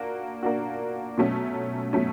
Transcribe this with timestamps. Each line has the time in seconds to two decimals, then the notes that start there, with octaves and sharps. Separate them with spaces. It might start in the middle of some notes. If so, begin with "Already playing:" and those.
Already playing: A#3 D4 F#4
0.43 A#3 D4 F#4
1.18 B2 F#3 A3 C#4
1.93 B2 F#3 A3 C#4